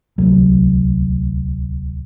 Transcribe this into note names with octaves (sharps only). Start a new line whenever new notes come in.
D1 C2 F#3